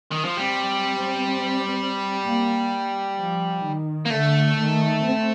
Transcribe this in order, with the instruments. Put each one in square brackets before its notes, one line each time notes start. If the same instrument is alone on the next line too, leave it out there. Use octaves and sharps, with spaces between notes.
[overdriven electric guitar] D#3
F3
[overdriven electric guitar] G3 [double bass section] C4
[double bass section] A#3
F3
D#3
[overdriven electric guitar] A#3
[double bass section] D3 [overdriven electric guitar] A3
[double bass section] D#3
C4